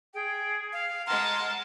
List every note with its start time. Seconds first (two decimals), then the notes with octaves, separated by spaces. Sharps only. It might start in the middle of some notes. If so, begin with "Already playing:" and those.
0.14 G#4 G5
0.73 F5
1.07 G#3 F#5 A5 A#5 C6 F6